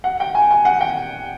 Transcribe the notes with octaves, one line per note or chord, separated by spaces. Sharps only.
F#5
G5
G#5
G#5
F#5
G5